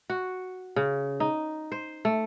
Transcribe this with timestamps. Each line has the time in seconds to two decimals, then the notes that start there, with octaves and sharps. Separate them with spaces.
0.10 F#4
0.76 C#3
1.20 D#4
1.72 C5
2.05 A3